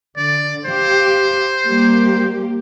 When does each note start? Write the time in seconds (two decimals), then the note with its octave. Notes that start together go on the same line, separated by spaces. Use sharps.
0.17 D3 D5
0.65 G4 C5 F5
1.68 G3 A#3 G4